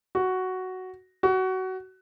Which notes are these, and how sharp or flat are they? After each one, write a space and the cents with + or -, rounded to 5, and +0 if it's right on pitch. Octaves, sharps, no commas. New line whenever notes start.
F#4 +5
F#4 +20